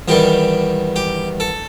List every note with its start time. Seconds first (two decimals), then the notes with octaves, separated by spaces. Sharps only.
0.08 E2 D#3 G3 G4
0.96 G4
1.40 A4